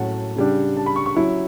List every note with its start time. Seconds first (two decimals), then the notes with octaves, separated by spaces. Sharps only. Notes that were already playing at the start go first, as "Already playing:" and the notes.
Already playing: A2 F#3 C#4 F#5 A5
0.36 C#3 G3 D4
0.77 A5
0.86 B5
0.96 C#6
1.06 C#6
1.16 F#3 C#4 E4